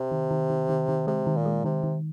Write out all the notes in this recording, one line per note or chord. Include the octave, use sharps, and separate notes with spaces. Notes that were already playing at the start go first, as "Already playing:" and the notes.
Already playing: C3
D#3
D#3
D#3
D#3
D#3
C3 G#3
D#3
A#2
G#3
C3 D#3
D#3